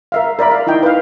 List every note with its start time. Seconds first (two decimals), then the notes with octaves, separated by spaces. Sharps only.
0.12 A#4 E5 F5
0.39 A#4 D5 E5 B5
0.51 F5
0.67 D#4 E4 D#5 G5
0.83 B4 F5